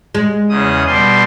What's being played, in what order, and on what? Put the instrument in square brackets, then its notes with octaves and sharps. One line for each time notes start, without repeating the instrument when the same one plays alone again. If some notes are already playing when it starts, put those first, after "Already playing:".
[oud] G#3
[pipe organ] E2 C#3 D#6
B2 G3 C6